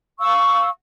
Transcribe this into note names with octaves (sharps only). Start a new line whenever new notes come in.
F5 C#6 E6